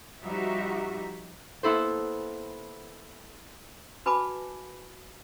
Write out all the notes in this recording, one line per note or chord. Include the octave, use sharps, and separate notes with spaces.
F3 G3 D#4 F#4 E5
A#3 B3 E4 A4 C5
F#4 B4 G#5 A5 B5 D6